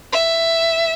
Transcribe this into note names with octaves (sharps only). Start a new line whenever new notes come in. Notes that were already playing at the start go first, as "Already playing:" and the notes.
E5